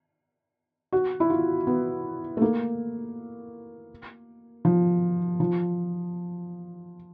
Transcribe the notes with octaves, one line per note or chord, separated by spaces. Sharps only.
F#4
E4
F4
B3
A3
A#3
F3
F3